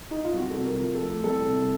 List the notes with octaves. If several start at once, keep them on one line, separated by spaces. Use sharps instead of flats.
D#4
F4
C2 F#4
A4
C3
A#4
F3
A4
A3
C2 A4
C3